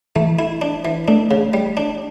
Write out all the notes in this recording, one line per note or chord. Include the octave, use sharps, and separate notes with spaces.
E3 A3
E4
D4
E3
A3 D4
C#3
G3
D4